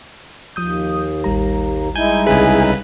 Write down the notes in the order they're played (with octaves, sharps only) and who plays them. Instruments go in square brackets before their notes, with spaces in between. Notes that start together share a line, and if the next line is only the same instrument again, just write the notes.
[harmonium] D#2 [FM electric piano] F3 D#6 G6
[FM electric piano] A1 G3 A#5
[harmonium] G#3 D#4 E4 [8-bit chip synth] G#5 G6
[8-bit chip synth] C2 C#3 B4 [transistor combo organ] G#4